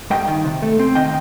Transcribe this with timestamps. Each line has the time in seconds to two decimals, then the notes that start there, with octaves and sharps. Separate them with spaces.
0.10 G2 D#5 G5
0.27 D#3
0.44 C3
0.62 A3
0.79 C4
0.95 D#3 D#5 G5